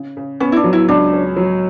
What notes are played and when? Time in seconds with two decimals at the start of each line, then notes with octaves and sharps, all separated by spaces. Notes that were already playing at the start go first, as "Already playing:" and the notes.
Already playing: C#3
0.17 C#3
0.40 B3 C#4
0.52 E4
0.56 D4
0.64 F#3
0.73 E4
0.88 C#2 D4
1.13 C#4
1.36 F#3